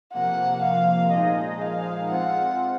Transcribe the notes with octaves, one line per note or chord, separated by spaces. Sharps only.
C3 F3 A#3 F#5
F5
A#2 F3 G#3 D#4 G#4 D#5
F5
G#3 C4 F4 F#5